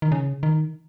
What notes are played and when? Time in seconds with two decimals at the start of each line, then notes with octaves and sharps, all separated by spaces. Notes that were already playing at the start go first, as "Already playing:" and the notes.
0.02 D#3
0.12 C#3
0.43 D#3